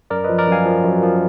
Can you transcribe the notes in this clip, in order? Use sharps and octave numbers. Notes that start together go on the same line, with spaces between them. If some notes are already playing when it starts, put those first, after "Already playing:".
F#2 A#4 D5
F3 B4 D#5
A#4 D5
F#2 F5 G#5
F3
F#2
F3